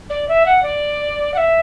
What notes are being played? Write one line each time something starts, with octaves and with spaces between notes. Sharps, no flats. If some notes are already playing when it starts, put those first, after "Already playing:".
D5
E5
F#5
D5
F#5
E5